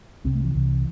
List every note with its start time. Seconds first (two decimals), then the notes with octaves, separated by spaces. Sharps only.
0.24 C2 C3 C4
0.35 A3
0.44 E3
0.54 C2 C3 E3